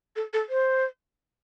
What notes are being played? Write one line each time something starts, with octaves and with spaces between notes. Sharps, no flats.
A4
A4
C5